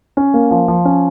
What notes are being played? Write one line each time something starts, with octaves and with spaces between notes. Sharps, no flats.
C#4
A#3
F3
F3
C#4